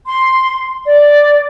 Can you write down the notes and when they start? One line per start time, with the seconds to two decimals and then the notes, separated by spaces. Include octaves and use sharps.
0.07 C6
0.86 D5